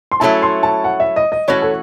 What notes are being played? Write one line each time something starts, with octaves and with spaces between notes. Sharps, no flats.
C6
F#3 A3 C#4 E4 A5
C6
A5
F#5
E5
D#5
D#5
E3 A3 C#4 F#4 C#5
A4